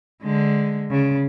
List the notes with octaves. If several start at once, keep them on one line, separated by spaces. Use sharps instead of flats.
D3 G#3
C#3